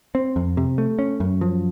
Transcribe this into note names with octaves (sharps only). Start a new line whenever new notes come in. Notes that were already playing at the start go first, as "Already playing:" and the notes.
C4
F2
C3
A3
C#4
F#2
F3